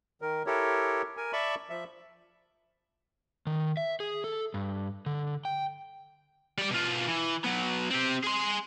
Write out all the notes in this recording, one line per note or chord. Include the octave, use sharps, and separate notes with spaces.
D#3 A#4
E4 G4 A4 A#4 C#5
A#4 G#5
D5 E5 A5 B5 C#6
F3 E5
D#3
E5
G#4
A4
G2
D3
G5
G3 D5
B2 F4
E3
F#3 B3
C4 G4
G#4 C6